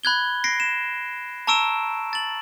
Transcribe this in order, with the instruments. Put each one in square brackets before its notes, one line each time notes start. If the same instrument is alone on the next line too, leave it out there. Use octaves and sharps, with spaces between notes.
[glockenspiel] B5 F#6 G#6 G7
A#6 C7 D7
E7
A5 A#5 C#6 E6 D7 E7
A6 F#7